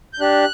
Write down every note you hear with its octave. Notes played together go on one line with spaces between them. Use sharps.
G6
D4 G4 F#6